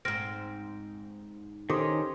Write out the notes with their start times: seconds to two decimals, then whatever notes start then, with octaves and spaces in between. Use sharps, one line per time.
0.05 G#2 C4 F6 A#6 D7
1.70 D#3 C#4 G4 A4 C5 D#6